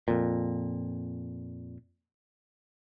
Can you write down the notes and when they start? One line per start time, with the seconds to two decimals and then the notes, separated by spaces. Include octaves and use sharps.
0.08 F2 A#2